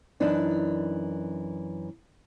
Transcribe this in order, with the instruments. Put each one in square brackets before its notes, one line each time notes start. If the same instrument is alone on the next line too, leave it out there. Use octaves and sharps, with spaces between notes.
[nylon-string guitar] F#2 E3 D4 D#4